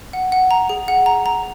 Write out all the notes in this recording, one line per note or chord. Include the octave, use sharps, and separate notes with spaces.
F#5
F#5
A#5
G#4
F#5
A#5
A#5